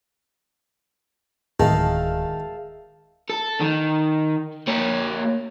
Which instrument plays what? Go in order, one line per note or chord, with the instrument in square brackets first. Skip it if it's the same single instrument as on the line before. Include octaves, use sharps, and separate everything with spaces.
[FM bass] D1 [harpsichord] D#3 [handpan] G#4 [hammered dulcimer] E5 F5 A5
[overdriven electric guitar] A4
D#3
A#3 C#5